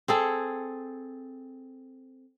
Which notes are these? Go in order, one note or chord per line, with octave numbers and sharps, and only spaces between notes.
C4 G#4 A4